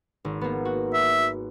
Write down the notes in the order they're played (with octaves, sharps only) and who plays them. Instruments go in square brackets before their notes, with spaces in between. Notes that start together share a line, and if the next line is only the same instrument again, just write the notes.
[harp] G#1
A#3 B3
F#4
[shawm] E5